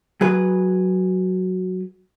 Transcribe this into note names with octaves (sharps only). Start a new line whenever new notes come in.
F#3 G#4 B4